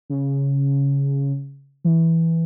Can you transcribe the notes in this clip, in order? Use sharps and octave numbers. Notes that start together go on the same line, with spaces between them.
C#3
E3